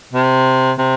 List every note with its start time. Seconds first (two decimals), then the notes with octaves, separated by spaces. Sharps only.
0.13 C3
0.79 C3